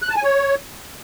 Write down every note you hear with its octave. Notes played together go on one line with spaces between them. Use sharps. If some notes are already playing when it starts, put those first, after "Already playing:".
F#6
A5
G#5
C#5